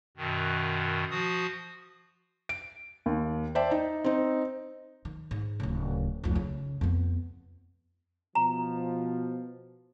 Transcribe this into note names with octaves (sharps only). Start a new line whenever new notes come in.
F#2 B2 D#3
F3 F#4 D#6
D7
D#2
C5 D5 E5 G5 A5
D#4
C4 D#4
D#3
G#2
D1 C#3
F1 C#2
C#3
F2 B3
B2 F3 A#5